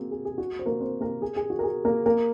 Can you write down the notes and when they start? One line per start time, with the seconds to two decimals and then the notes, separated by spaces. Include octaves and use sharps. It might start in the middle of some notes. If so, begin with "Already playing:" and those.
Already playing: A#3 C4 F#4 G#4 A#4
0.11 G#4
0.25 G#4
0.38 F#4
0.59 C5
0.66 A#3 A#4
0.80 C4 C5
1.01 A#3 A#4
1.22 G#4
1.36 G#4
1.50 F#4
1.59 A#4
1.63 G#4
1.85 A#3 A#4
2.06 A#3 A#4